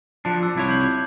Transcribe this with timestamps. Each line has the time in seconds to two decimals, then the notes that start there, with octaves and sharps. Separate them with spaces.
0.25 F3 D4 A5 F#6 C#7
0.41 D6 E6 F#6
0.55 C2 E4 C#5
0.69 G6 C7 F#7